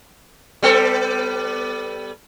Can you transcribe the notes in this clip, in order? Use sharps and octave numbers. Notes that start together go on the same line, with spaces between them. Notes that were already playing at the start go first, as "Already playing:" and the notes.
G3 B3 A4